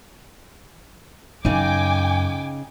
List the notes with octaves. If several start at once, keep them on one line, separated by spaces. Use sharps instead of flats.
F#2 C#3 D#4 G5 G#5 D6